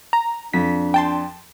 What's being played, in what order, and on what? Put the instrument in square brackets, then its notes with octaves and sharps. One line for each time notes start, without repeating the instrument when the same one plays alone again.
[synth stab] A#5
[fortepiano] F2 [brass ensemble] D4 [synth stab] B6
[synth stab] G5 A5 C6